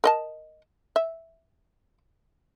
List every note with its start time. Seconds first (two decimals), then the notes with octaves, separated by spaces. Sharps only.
0.04 A#4 D#5 A5
0.96 E5